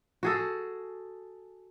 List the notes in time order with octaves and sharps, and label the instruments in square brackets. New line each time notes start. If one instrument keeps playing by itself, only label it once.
[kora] F#4 G#4 A4